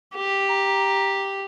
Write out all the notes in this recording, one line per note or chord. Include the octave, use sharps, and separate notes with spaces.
G4
A#5